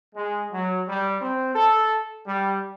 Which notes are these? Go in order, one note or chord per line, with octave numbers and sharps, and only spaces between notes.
G#3
F#3
G3
C4
A4
G3